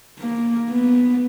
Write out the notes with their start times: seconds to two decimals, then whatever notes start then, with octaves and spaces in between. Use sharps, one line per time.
0.20 A#3
0.70 B3